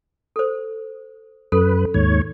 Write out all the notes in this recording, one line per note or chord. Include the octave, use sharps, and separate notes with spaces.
A4 C5
F#2 A4 B4
D#2 G#2 C#5